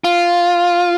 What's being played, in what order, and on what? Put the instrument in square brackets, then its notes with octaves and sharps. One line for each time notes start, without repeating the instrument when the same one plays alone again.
[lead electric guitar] F4